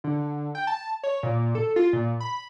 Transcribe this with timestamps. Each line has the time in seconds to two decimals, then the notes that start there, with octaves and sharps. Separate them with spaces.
0.04 D3
0.55 G5
0.67 A5
1.03 C#5
1.23 A#2
1.55 A4
1.76 F4
1.93 A#2
2.20 B5